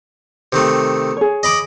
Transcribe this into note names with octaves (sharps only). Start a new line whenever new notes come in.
C3 D#3 A3
G#4 C#5
D#5 B5 D6